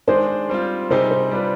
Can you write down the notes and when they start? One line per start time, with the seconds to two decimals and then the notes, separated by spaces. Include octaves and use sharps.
0.07 D#3 G#3 D4 G#4 C5
0.49 G3 C4 F4
0.90 C3 G3 C4 D#4 G#4 C5
1.11 C5
1.31 G3 D4 F4 B4